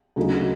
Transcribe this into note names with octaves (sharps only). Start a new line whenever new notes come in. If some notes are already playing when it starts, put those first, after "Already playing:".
D2 C#3 F#3 A#3 D#4